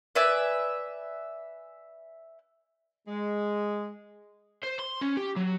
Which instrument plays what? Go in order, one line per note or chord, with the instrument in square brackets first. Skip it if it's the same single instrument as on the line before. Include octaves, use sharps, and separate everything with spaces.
[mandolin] B4 D5 E5 G#5
[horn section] G#3
[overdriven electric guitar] C5
C6
C#4
G4
F#3